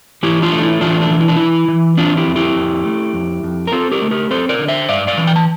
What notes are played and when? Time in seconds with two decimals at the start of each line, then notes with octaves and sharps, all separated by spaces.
0.23 E3 E4 G4
0.42 D4 F4
0.52 A3
0.63 E4
0.81 E3 D4 F4
1.01 D4
1.11 E3
1.20 E4
1.28 D4
1.36 E3 E4
1.68 E3
1.97 C4 D4 F4
2.17 E4 G4
2.27 F2
2.36 E4 G4
2.55 F2
2.85 A3
3.14 F2
3.43 F2
3.67 A#4
3.72 C4 F4 A4
3.91 G4 A#4
4.02 A3
4.11 G4 A#4
4.31 C4 A4 C5
4.49 A#4 D5
4.59 D3
4.68 C5 E5
4.89 G2 D5 F5
5.07 D5 F5
5.17 E3
5.27 G5
5.36 A5